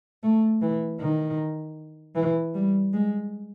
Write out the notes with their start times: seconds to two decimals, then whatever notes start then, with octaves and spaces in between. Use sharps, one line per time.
0.23 A3
0.62 E3
1.00 D#3
2.16 E3
2.54 G3
2.93 G#3